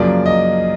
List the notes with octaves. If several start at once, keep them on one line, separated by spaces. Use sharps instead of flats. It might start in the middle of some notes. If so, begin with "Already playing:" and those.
Already playing: F#2 C#3 F3 A#3 D5
D#5